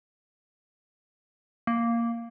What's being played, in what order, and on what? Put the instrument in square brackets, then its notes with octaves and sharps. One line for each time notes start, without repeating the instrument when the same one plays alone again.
[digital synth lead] A#3